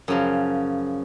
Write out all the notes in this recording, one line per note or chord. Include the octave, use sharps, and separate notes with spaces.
F#2 C#3 F3